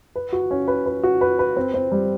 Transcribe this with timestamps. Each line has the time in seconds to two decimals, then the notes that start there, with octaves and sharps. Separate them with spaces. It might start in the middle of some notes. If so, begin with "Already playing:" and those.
0.16 B4
0.33 F#4
0.51 C#4
0.68 B4
0.86 B4
1.03 F#4
1.21 B4
1.39 B4
1.57 C4
1.74 C4
1.92 G3